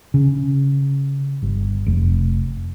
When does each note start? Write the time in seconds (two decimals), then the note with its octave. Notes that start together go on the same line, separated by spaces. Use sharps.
0.14 C#3
1.42 G1
1.86 F1